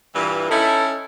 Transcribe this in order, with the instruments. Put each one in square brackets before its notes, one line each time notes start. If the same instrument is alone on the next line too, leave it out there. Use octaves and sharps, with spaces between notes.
[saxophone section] G2 A#2 E3
[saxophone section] C#4 D#4 E4 [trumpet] A4